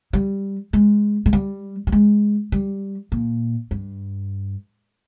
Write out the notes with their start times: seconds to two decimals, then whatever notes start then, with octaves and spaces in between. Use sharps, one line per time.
0.13 G3
0.73 G#3
1.26 G#3
1.33 G3
1.87 G3
1.92 G#3
2.52 G3
3.12 A#2
3.71 G2